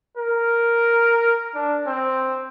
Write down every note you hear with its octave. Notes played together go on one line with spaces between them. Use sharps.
A#4
D4
C4